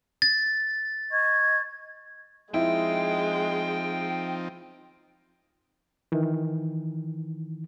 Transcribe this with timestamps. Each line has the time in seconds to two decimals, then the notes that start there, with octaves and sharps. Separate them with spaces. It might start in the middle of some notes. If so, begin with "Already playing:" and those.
0.22 A6
1.11 D#5 C#6 G#6
2.54 F3 G#3 C4 D#4 E4 G5
6.12 D#3 E3